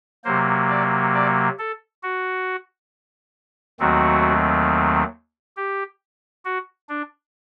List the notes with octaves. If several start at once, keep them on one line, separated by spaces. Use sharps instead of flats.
C3 F#3 A#3 C5
D5
D5
A4
F#4
D#2 D#3 F#3 A3 C4 F#4
G4
F#4
D4